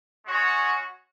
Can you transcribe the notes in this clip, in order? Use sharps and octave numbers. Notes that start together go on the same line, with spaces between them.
G#3 C#4 F#4 C#5